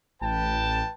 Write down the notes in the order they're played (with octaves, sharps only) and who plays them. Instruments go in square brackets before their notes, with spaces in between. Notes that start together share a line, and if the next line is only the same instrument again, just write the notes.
[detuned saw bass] A1 [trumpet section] B4 G5 A5